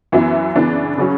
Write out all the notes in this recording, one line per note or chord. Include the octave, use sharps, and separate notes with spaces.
F#2 E3 B3 E4
C#3 E3 B3 D4
C#3 F#3 C#4